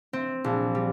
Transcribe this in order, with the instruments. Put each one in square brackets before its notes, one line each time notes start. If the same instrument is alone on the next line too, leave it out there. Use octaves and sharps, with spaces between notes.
[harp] C4
A#1
G3